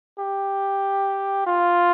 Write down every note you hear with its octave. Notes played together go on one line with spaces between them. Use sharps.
G4
F4